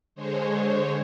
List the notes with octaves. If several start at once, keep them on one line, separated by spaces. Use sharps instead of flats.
D3 G#3 C5 C#5